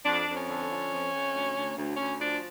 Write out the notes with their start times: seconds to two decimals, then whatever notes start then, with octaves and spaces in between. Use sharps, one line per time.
0.05 F2 D4
0.26 F2
0.36 C#4
0.48 D3
0.68 F3
0.91 F2
1.12 F2
1.33 D2
1.55 D2
1.76 D2
1.97 D2 C#4
2.18 F3 D4